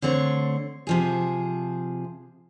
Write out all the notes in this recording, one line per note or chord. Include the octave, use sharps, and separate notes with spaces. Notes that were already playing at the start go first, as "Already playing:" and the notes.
D3 A3 C4 C#5
C3 F3 G#4